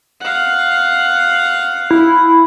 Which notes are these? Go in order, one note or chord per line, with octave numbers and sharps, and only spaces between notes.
F5 F#5
E4